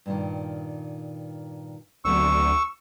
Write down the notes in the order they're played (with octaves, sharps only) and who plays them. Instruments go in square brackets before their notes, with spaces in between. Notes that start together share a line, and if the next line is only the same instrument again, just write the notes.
[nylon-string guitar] G2 A#2 D#3
[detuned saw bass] D2 [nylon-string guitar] F#3 B3 C4 [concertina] C#6 E6